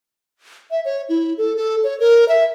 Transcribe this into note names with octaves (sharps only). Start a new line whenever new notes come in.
E5
C#5
E4
A4
A4
C#5
A#4
E5